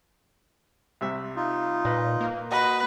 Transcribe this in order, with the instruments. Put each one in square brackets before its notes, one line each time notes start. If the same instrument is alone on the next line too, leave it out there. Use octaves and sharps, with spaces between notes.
[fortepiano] C2 C3 E5
[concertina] D#4 F4
[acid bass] A#2 [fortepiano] B4 D#5
[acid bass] A#3
[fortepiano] F#4 D#5 [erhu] B4 [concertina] D#6